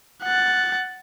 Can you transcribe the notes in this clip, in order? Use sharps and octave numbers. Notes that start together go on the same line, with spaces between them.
F#5 A6